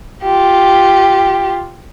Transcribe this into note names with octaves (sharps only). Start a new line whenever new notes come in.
F4 G4